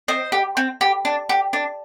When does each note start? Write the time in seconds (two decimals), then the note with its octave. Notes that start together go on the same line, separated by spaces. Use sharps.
0.08 C4 C5 D#5
0.32 G4
0.57 C4
0.81 G4
1.05 D4
1.29 G4
1.53 D4